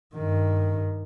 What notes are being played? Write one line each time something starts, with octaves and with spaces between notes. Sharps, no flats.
G2 D#3